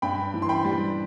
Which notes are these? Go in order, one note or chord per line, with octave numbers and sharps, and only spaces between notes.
G2 G5 B5
E3
C6
G5 B5
G3